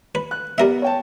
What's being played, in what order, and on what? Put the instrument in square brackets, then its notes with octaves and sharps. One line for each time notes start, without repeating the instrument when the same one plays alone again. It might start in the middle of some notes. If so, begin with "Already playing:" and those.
[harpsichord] B4
[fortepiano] F#6
[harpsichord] G3 A#4 E5 [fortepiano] B3
[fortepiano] C#5 G5 A5